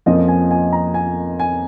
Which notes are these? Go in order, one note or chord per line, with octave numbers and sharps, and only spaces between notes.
F2 F3 A#3 C#4 D#5
G#5
G#5
A#5
G#5
G#5